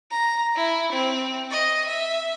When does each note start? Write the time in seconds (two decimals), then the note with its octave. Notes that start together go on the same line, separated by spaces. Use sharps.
0.11 A#5
0.56 E4
0.93 C4
1.51 D#5
1.87 E5